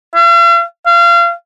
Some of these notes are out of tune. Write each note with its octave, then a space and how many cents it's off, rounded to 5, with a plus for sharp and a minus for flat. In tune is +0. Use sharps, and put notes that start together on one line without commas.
F5 -45
F5 -30